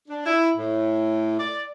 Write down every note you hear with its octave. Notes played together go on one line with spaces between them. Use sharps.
D4
E4
A2
D5